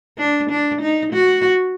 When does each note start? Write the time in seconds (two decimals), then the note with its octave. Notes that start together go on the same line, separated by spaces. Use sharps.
0.18 D4
0.50 D4
0.81 D#4
1.13 F#4